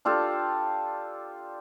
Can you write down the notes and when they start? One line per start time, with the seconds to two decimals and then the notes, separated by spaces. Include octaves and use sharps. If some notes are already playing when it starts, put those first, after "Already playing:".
0.05 D4 F4 G4 A4